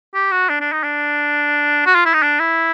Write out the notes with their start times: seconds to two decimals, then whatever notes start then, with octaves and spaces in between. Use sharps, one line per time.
0.15 G4
0.32 F#4
0.49 D4
0.61 D4
0.72 D#4
0.83 D4
1.86 F#4
1.95 F4
2.05 E4
2.14 D#4
2.23 D4
2.40 E4